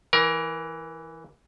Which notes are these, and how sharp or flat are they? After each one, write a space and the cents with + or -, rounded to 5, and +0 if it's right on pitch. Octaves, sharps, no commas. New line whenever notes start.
E3 +0 A#4 +20